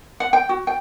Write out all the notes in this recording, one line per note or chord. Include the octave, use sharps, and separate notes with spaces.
F#5
G5
F#4
G5